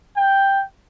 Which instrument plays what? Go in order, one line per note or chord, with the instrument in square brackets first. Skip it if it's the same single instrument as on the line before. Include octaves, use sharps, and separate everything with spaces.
[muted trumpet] G5